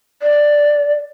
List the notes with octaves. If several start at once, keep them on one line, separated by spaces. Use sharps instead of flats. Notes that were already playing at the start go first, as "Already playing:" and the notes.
D5